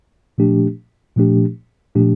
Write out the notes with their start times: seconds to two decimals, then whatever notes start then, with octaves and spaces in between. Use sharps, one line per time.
0.38 A#2 F3 A3 D4 G4
1.16 A#2 F3 A3 D4 G4
1.95 A#2 F3 A3 D4 G4